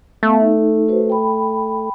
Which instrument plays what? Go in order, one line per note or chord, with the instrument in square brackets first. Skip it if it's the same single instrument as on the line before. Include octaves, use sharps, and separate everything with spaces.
[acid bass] A3 [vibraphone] B3 F5
[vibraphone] D#4
F#4 B4 C5
G5 B5